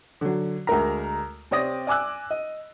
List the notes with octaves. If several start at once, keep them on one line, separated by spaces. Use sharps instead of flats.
D3 F#3
D2 G#3 A#4 A#5
C3 C4 C#5 D5 D#6 A#6
D5 G#5 D6 E6 F#6
D#5